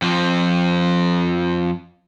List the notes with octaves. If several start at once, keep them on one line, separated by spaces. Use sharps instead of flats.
F2 F3